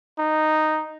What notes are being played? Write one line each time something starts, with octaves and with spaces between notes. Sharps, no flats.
D#4